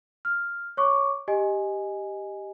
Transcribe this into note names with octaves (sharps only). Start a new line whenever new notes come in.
F6
C#5 C#6 D6
G4 D#5 G#5